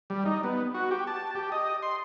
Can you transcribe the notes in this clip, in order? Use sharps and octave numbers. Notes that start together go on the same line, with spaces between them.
G3
D#4
B3
F#4
G4
A5
G4
D#5
C6